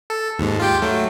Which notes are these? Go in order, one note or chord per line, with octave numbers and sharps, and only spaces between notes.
A4
D#2 G#2
F4 G4 G5
F#3 A3